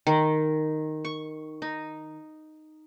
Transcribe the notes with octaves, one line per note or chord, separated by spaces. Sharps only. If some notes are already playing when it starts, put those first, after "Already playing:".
D#3
C#6
D#4